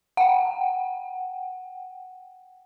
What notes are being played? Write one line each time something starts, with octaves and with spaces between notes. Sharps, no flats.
F#5 G5